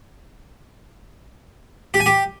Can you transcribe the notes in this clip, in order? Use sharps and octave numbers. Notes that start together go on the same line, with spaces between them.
G4
G#5
G4